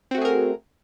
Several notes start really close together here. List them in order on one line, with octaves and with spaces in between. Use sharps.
C4 F#4 A3 G#4 A#4